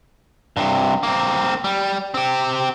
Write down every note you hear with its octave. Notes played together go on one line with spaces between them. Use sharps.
G2 C3
A#3 C4
G3
C4 G4